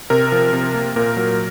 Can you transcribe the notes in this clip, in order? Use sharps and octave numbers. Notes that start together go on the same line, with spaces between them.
C3 A#4
F3
C3
A#3
A#2 A#4
F#3